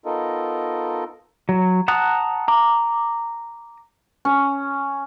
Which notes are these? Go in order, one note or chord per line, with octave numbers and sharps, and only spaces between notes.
B3 D#4 F4 A4 A#4 D#5
F#3
F#5 A5 A#5 D#6 F#6
A#5 D6
C#4